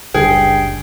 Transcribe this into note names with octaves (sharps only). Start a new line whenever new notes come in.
F#1 C#2 G2 G#4 G5